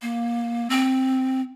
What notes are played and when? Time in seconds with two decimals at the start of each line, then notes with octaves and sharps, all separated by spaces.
0.02 A#3
0.70 C4